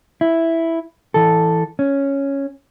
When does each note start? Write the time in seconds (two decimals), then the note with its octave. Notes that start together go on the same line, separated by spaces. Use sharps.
0.21 E4
1.14 E3 A4
1.79 C#4